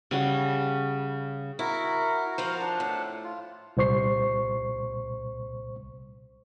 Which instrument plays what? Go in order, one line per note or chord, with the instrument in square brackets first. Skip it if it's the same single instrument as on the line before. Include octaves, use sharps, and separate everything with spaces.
[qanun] C#3 G3 F#4
[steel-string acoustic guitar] E4 [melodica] F#4 A#4
[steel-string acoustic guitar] F3 F4 C5
[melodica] D4 F#5 A5
[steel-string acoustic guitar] A2
[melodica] F4
[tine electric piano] C2 A#2 C5 C#6 C7